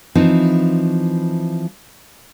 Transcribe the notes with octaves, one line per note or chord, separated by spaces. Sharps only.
E3 F3 C4 D#4